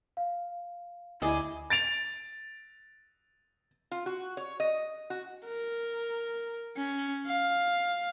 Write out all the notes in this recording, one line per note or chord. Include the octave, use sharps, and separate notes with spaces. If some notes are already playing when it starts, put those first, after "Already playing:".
F5
D2 E4 G#4 D5 D#5
A6 D7 F7
F4
F#4
C#5
D#5
F#4
A#4
C#4
F5